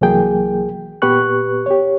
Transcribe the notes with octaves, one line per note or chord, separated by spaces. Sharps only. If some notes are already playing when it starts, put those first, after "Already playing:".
C2 E3 F#3 A#3 G#4 G5
A#2 B3 G4 B4 C#6 F#6
G4 C#5